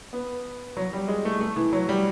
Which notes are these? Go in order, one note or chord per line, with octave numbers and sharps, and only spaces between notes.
B3
F#3
G3
G#3
A3
A3
E3
F#3
G3